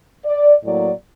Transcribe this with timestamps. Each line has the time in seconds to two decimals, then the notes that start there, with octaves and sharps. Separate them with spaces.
0.25 D5
0.64 A2 F#3 A#3 D5